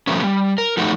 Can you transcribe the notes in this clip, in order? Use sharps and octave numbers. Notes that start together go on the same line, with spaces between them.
F3 G3 A3 B3 C#4
G3
A#4
F3 A3 D#4 F#4 G4 A4